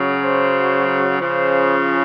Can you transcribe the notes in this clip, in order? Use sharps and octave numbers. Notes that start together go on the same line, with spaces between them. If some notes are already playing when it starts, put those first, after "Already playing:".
Already playing: C#3 F#3
C5
C#3 F3 C5